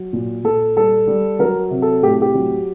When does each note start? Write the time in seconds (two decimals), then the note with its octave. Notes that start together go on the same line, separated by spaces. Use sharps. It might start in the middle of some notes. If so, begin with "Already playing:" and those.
Already playing: F#3
0.13 A#2
0.44 A#2 A4
0.76 G3 A4
1.07 G3
1.39 F#3 A#4
1.71 C3
1.82 A4
2.02 A2 G4
2.22 G4
2.34 F#3